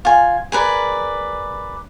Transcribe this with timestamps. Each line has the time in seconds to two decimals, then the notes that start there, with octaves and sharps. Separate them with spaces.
0.05 F4 G#5
0.52 G#4 A#4 B4 D5